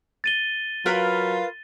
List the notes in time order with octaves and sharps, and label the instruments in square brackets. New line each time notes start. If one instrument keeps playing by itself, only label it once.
[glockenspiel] A6 D#7 G7
[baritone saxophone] F#3 [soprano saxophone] F4 [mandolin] A#4 B4 F5